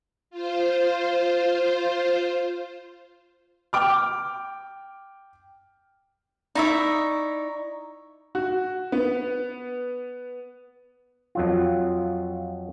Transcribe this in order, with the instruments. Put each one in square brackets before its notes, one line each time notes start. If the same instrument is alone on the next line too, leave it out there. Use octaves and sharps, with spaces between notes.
[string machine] F4 C5
[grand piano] G5 D6 F6
[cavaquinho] D#4 E4 E5 [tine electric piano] D5 A#5 C#6
[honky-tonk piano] F#4
B3
[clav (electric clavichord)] F2 F#3 F4